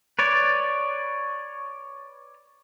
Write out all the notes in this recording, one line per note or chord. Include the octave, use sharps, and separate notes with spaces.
B4 C#5 D5